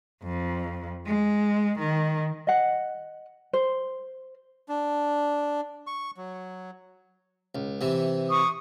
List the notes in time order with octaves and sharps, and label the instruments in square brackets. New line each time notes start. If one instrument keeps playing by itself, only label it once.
[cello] F2
G#3
D#3
[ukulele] D#5 F#5
C5
[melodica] D4
C#6
F#3
[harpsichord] C#2
C3 E3
[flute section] C#6 D#6